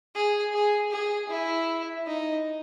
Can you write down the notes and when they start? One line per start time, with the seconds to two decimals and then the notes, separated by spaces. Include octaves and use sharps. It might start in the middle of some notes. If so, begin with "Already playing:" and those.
0.15 G#4
0.54 G#4
0.91 G#4
1.29 E4
2.07 D#4